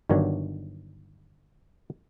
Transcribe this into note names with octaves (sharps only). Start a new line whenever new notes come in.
G1 G2 D#3 F#3 D4 C#5